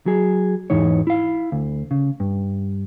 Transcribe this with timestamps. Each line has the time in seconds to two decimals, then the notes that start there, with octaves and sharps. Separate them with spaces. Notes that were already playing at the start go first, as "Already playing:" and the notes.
0.06 F#3 G#4
0.70 E2 G#2 E3 D#4 C#5
1.07 E4 F5
1.52 D2
1.91 C#3
2.20 G2